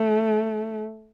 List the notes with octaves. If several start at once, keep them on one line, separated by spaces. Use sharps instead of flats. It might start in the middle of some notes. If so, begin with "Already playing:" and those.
Already playing: A3